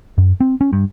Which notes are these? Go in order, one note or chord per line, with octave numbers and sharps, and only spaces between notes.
F#2
C4
C#4
G2